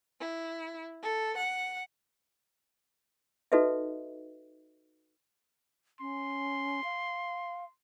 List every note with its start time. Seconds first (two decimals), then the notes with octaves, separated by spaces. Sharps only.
0.20 E4
1.03 A4
1.37 F#5
3.52 D#4 F#4 A4 B4 D#5 E5
6.01 C#4 C6
6.84 F5